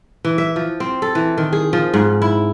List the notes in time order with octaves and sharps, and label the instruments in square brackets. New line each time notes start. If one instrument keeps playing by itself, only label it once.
[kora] E3
E5
F3
C4
A4
E3
D#3
G#4
F3
G#2
E4